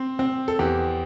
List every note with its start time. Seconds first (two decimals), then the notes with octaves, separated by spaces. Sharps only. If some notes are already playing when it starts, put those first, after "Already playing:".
Already playing: C4 C5
0.19 C4
0.48 A4
0.59 E2 G4